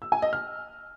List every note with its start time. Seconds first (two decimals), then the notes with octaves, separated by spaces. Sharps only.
0.02 E6
0.12 G#5
0.22 D#5
0.33 F6